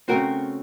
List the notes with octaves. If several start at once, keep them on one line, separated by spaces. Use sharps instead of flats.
C#3 A3 C4 F#4 A#4